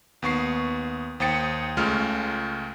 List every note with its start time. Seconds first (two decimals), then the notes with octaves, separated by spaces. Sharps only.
0.22 D#2 B3 C#6 C7
1.20 D#2 C5 G5 D#6 A6 C#7
1.77 C#2 C#3 G#3 A3 F4 F6